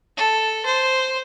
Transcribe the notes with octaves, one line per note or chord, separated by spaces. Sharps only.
A4
C5